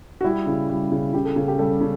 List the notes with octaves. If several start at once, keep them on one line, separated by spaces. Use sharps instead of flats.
F#4
G3 E4
C#3
G3
C#3
C#3 G4
A4
C#3
G4
G3 A4
C#3